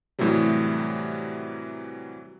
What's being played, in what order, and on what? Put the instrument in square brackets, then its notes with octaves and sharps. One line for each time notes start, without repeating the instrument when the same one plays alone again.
[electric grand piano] A2 C3 E3 F#3 G3